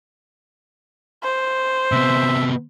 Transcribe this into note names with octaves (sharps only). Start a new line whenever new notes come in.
C5
C3 B3 E5